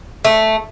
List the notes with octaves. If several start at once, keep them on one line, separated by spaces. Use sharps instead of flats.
A3